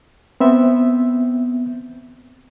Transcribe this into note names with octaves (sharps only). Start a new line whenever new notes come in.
B3 C4 E5